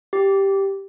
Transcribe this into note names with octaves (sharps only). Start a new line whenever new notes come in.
G4